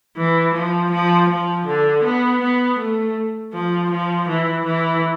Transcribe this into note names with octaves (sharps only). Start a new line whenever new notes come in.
E3
F3
F3
F3
D3
B3
B3
A3
F3
F3
E3
E3